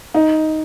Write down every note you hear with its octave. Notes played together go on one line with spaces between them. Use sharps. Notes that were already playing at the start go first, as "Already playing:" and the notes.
D#4